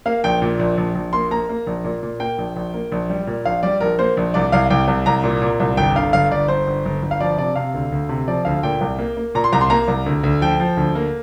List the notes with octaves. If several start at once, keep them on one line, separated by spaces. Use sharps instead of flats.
A#3 F5
A#1 G5
A#2
A#1
A#1
A#1
A#3 C6
A#3 A#5
A#3
A#1
A#2
A#2
A#3 G5
A#1
A#1
A#3
A#1
G3
A#2
A#1 F5
G3 D5
A#1 A#4
A#3 C5
A#1
C2 D5
C2 F5
C2 G5
C2
C2 A#5
A#2
A#2
C2
G1 G5
D3 F5
G1 F5
G1 D5
G1 C5
G1
G1
G1
F5
F3 D5
C3 D5
C3 F5
D2
D2
C3
F3 D5
D2 F5
A#2 G5
C2
A#3
A#3
A#2 A#5
C6
C2 A#5
C6
A#3 A#5
C2
D2
D2
F3 G5
F3
D2
A#3